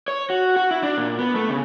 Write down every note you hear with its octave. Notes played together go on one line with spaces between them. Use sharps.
C#5
F#4
F#4
E4
D4
A#2
B3
A3
C#3